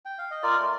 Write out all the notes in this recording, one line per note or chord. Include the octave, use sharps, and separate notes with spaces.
G5
F5
D#5
F4 A#4 D5
A3